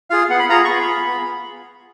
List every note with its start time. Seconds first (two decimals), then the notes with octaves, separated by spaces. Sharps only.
0.10 F4 G#4 F5
0.29 B3 F#5
0.39 B5
0.49 F4 G#4 A#5
0.65 C#6
0.68 B3 B5
0.87 F4 G#4
1.06 B3